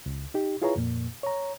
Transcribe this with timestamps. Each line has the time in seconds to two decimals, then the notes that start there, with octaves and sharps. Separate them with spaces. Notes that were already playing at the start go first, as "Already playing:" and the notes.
0.06 C#2
0.34 D#4 G4
0.62 E4 F4 G#4 B4 C#5 A#5
0.76 F2 A#2 A#3
1.23 C#5 A#5